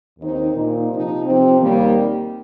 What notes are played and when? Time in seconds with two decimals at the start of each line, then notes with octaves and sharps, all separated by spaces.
0.18 D#2 D#3 C4 D#4
0.53 A#2 A#3 D#4
0.88 C3 F3 D#4
1.24 C3 F3 C4
1.59 D#2 D#3 G3 A#3